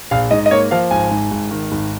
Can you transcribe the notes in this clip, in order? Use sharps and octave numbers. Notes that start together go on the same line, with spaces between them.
A#1 F5
G#2 D#5
D#5
A#3 C#5
F3 F5
G#1 G#5
G#2
G#1
D#3
G#1